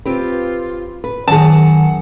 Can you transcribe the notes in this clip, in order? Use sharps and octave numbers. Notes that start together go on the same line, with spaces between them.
C4 F4 G4 B4
B4
F#2 D#3 G#4 F#5 A5